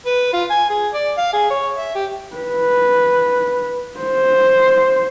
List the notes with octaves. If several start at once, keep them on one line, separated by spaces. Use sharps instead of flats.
B4
F4
G#5
G#4
D5
F5
G#4
C#5
E5
G4
B4
C5